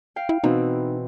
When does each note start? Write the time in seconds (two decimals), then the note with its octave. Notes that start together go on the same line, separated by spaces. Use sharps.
0.16 F5 G5
0.29 E4
0.44 B2 E3 C4 D#4